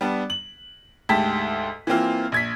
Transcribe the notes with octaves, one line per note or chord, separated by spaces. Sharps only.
G3 B3 D4
F#7
D2 G#2 G4 A5 B6
E3 A#3 C4 F4
A#1 G#6 B6